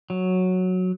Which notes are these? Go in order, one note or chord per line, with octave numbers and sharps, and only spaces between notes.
F#3